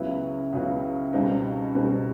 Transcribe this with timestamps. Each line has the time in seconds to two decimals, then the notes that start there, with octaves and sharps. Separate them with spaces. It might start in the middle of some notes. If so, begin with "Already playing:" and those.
Already playing: C#2 C#3 F#3 B3 E4
0.53 C#2 C#3 F#3 B3 E4
1.13 C#2 B2 G3 C4 D#4
1.75 C#2 B2 G3 C4 D#4